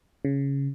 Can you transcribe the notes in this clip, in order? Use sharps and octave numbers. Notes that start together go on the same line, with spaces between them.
C#3